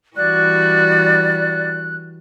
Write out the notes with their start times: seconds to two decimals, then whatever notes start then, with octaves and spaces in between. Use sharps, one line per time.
0.17 E3 G3 F#4 D5 F#6